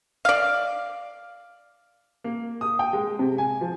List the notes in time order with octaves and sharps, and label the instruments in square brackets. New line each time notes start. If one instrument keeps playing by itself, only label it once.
[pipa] D5 F5
[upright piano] A#3
D#6
G5
G#3
C3
G#5
F3